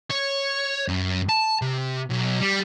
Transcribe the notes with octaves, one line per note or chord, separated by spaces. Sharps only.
C#5
F#2
A5
C3
B1
G3